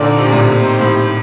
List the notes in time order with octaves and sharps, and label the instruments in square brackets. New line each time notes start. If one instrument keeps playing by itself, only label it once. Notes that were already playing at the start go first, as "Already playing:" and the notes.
Already playing: [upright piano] A#2 D3 [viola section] C4 D#4 A4 D5
[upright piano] C3
A#2
A2 C3
[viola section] A#3 D#4 G4 C5
[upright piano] A2